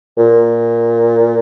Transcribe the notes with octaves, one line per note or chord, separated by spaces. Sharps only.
A#2